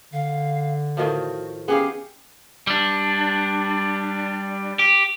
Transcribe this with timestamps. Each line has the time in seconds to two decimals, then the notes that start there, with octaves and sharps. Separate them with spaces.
0.13 D3 F5
0.97 A2 D#3 F3 F#4
1.68 B3 C#4 G4 G#4 F5
2.67 G3 D4
4.79 G4